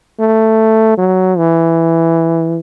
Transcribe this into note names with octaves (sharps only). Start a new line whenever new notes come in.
A3
F#3
E3